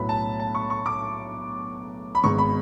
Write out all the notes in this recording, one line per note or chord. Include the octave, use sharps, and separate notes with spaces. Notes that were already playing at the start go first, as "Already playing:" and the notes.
Already playing: B1 A2 F#3 B3 B5
A5
A5
C#6
C#6
D6
B5
G#1 G#2 G#3 B3 C#6
B5